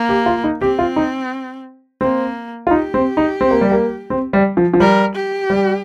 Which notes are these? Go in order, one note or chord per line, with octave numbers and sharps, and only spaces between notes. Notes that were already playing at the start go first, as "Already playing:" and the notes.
Already playing: A#3
G4
F4
D#4
C4 G4
F4
D#4
A#3 C4
F4
D#4 G4
C4
D#4
C4
A#3
G3
A#3
C4
G3
F3
F3
G3 A#4
G4
G3